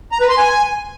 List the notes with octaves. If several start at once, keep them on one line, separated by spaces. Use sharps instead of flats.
A#5
B4
C6
G#5